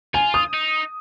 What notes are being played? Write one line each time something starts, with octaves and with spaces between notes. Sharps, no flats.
F4 G#5
D#6
D#4